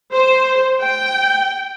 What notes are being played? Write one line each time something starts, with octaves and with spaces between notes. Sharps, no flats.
C5
G5